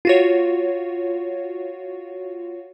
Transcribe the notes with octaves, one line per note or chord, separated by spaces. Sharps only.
F4 F#4 C#5